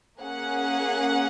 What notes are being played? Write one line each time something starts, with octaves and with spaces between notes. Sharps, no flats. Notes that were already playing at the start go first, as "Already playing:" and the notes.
A#3 C#4 G#4 F#5